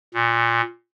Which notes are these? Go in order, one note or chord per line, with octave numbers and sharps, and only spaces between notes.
A#2